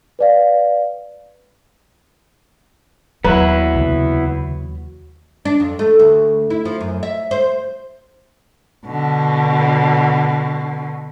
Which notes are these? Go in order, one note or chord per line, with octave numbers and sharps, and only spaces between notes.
B4 D5 F5
D#2 F#3 B3 E4 B4
C#2 C3
D4
F2
A3
D2
E4
F3
F#2
E5
C5
B2 D3